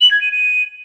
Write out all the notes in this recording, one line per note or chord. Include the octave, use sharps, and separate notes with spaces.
F#7
G#6
D#7
D#7